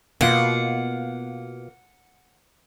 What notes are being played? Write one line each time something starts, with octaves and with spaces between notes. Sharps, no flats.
B2 A#3 F4 F#5